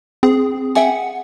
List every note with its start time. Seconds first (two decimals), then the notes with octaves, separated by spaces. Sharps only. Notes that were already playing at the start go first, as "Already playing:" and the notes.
0.23 C4 G#4
0.75 G#4 E5 F#5 G5